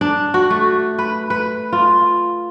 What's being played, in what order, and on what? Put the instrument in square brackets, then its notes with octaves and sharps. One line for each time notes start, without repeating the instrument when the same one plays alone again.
[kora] D4
F#4
A3
B4
B4
F4